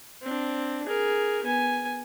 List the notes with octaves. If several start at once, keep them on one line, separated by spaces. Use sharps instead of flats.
C4 D4
G#4 A#4
B3 G#5